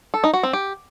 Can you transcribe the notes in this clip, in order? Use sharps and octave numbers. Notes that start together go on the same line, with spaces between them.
A4
D#4
F#4
C4
G4